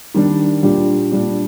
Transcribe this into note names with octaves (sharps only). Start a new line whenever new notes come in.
D#3 G3 D4
A#2 G3 D4 G4
A#2 G3 D4 G4